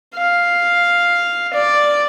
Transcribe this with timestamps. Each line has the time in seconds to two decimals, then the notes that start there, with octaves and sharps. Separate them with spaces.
0.15 F5
1.54 D5